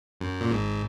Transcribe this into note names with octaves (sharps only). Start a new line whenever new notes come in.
F#2
A#2
G#1 G#2